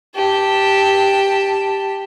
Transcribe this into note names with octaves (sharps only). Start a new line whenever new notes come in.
G4 A5